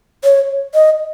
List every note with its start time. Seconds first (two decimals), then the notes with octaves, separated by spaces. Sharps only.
0.24 C#5
0.74 D#5